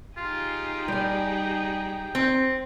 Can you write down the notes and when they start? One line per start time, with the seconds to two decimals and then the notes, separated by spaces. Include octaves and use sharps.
0.17 D#4 F4 G4 G#4
0.88 G3 G5 G#5
2.15 C4